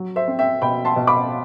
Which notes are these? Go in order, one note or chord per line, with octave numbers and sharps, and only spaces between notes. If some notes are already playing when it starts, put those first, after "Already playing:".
Already playing: F#3
C5 E5
C4
E5 G5
B2 G5 B5
A5 C6
B2
B5 D6